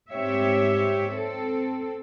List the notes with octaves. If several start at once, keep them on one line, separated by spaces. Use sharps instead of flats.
G#2 C4 G4 C#5 E5
C4 A4